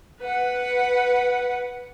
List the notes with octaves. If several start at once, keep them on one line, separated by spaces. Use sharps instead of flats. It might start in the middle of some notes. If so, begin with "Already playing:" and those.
B4 F#5